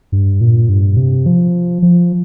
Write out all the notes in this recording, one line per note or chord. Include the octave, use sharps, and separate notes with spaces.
G2
A#2
G2
C3
F3
F3